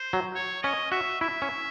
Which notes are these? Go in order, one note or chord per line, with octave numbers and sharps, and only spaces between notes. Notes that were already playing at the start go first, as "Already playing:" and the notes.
Already playing: C5
F#3
C#5
C#4 D#5
F#4 E5
E4 E5
C#4